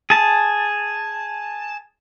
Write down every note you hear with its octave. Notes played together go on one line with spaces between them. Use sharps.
G#4 A5